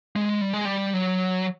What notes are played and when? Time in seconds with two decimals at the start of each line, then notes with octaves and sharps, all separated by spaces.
0.16 G#3
0.41 G3
0.54 G#3
0.65 G3
0.94 F#3